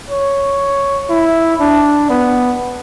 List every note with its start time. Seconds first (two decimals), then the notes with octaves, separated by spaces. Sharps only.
0.10 C#5
1.10 E4
1.60 D4
2.10 B3